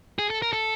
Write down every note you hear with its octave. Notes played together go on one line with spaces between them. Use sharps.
G#4
A4
A#4
A4